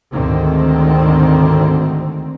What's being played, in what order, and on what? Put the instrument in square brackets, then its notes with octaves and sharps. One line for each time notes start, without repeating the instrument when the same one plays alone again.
[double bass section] D2 G#2 D3 D#3 C4